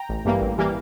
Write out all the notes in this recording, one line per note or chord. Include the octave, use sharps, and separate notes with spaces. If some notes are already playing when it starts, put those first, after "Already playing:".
Already playing: G5 A#5
A1
G2 E3 G3 A#3
A1
E3 G3 A#3